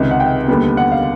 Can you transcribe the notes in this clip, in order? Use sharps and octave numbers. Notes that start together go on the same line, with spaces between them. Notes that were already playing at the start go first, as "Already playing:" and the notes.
Already playing: C#2 C3 D#3
F#5
G5
D#2 D3 G3 B3
F#5
F5